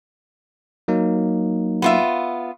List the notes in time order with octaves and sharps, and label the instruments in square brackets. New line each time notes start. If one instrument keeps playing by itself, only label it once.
[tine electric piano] F#3 A#3 D#4
[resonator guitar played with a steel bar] B3 F4 E5